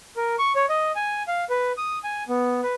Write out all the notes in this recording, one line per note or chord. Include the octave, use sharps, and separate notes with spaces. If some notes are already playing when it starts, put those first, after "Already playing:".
A#4
C#6
C#5
D#5
G#5
F5
B4
D#6
G#5
B3
B4